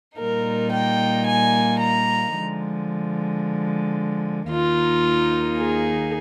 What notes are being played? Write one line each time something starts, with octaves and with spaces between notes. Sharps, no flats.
A#2 G3 A#3 D#4 A#4
G5
G#5
A#5
D3 F3 G#3
D#2 D#3 A#3 D#4 F4
G#4